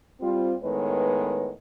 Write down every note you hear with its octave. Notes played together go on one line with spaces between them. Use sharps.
G3 C4 F4
A2 D#3 G#3 B3 B4 C#5